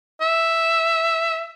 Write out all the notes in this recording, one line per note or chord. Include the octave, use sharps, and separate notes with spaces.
E5